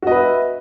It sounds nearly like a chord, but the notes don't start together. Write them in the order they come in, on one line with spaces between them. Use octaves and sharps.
F#4 D#5 B4 E5